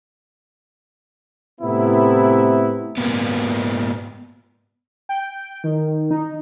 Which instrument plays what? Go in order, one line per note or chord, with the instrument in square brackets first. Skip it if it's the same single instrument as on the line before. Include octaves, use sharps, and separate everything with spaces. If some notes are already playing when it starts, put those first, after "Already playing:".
[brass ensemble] A2 C3 B3 E4
[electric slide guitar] G#2 A#3 B3
[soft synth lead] G5
D#3
D#4